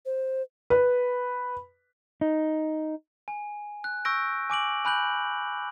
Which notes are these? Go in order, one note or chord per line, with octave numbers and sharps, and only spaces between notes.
C5
B4
D#4
G#5
F#6
C#6 E6 G6 A#6 D7
G#5 D6 D7 F#7
G#5 B5 F#6 G6 F#7